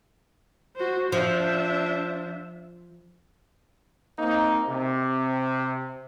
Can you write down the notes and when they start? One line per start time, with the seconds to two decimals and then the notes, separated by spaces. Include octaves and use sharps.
0.76 F#4 C5
1.12 F3 D4 E5
4.19 A#3 C4 D#4
4.69 C3